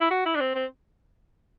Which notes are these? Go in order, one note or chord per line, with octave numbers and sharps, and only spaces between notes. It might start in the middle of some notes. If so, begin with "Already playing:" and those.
E4
F#4
E4
D4
C4
C4